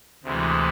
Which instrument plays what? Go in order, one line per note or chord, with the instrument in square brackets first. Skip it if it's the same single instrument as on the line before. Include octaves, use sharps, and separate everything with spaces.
[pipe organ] D2 C3 E3 G#3